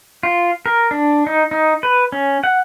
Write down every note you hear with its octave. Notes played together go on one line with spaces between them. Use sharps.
F4
A#4
D4
D#4
D#4
B4
C#4
F#5